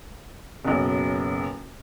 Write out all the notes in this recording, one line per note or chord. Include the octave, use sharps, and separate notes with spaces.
F#1 B1